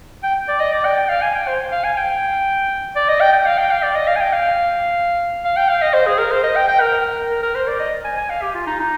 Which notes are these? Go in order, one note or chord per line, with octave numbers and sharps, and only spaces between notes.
G5
D5
D#5
D5
G5
G5
F5
G#5
G5
C5
F5
G#5
G5
D5
D#5
G5
G5
F5
G5
F5
D5
D#5
F5
G#5
G5
F5
F5
G5
F5
D#5
C5
G#4
A#4
C5
D#5
G5
G5
A#4
A#4
A#4
C5
D5
D#5
G#5
G#5
F5
G4
F4
D#4
D#4